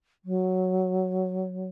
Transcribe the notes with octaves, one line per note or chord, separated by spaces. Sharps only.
F#3